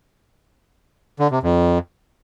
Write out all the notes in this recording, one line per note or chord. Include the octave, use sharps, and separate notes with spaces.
D3
C3
F2